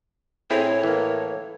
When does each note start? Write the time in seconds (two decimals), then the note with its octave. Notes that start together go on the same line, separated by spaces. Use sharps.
0.50 A2 C4 E4 G#4 C#5
0.83 E3 A#3